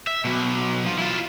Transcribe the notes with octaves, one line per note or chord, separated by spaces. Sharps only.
E5
B2 F#3
F3
E4 F4